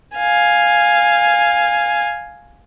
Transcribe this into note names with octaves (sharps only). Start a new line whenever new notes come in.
F5 G#5